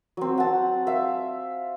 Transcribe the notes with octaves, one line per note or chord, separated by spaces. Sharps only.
F#3 C4
F#5 A5
E5 F5